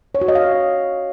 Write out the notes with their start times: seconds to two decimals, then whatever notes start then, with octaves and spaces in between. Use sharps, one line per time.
0.15 C#5
0.21 F#4
0.28 D#5
0.35 F5